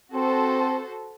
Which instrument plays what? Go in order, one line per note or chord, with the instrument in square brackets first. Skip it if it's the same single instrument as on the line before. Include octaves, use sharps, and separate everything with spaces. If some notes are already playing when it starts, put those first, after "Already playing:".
[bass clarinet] C4 [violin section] F#4 A4 C5